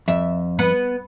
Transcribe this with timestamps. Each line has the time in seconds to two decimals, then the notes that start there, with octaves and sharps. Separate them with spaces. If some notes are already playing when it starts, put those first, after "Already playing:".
0.08 F2 E5
0.59 B3